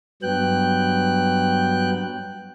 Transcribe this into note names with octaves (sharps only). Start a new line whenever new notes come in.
G2 F#3 B3 G5 F#6